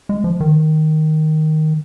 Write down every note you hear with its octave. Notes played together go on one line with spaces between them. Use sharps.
G#3
F3
D#3